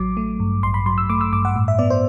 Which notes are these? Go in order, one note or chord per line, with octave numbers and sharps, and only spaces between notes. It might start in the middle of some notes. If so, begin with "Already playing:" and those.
Already playing: A1 F#3 D6
A3
G2
A1 C6
B5
F#3 C6
E6
A3 D6
E6
G2 D6
F#5
A2
E5
B3 D5
C5